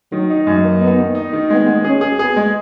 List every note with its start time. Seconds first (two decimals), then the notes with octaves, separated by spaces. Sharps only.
0.12 D#3 F#3
0.30 D#4
0.47 F#2 G#3
0.64 A#3
0.81 B3 D#4
0.99 D#3
1.15 D#4
1.33 D#3
1.50 G#3 B3
1.66 G#3
1.84 C#4 G#4
2.01 G#4
2.19 B3 G#4
2.36 G#3